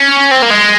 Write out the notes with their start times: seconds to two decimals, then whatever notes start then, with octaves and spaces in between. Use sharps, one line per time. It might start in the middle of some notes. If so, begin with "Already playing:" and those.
Already playing: C#4
0.31 C4
0.43 A#3
0.51 G#3